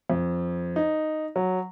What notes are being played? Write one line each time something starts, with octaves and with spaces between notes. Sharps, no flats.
F2
D#4
F#3